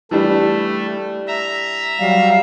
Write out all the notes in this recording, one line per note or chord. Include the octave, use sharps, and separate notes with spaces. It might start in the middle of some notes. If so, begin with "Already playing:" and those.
E3 G3 A3 D4
E5 A#5
F#3 G3 F5